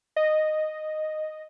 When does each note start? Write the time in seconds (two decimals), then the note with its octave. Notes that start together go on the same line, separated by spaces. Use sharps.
0.16 D#5